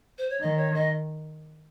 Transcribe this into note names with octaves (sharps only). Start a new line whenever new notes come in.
C5
C#5
D#3 D#5
C#5
D#5